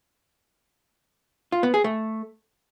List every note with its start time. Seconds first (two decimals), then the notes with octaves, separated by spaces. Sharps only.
1.52 F4
1.63 B3
1.74 G#4
1.84 A3